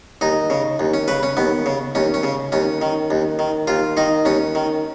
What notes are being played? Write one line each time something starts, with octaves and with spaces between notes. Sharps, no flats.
D#2 D#4
C#3
D#2
C#4
C#3 B4
C#4
D#2 B3
C#3
D#2 C#4
C#4
C#3
D#2 C#4
D#3
D#2
D#3
D#2 F4
D#3 D#4
D#2 C#4
D#3